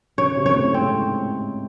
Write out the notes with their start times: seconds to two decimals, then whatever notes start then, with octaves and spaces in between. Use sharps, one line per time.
0.18 C#3 C#5
0.37 C3 C4
0.46 C#5
0.56 A2 A3
0.74 G#2 G#3 C4